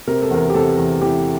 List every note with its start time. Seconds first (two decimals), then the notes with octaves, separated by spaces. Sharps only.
0.07 C3 A#4
0.22 A4
0.31 E2 A#4
0.50 G4
0.54 C3 A4
0.78 E2
1.01 E3 G4